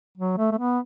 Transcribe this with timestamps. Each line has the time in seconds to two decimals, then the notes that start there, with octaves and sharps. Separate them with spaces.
0.17 F#3
0.38 A3
0.51 A3
0.58 B3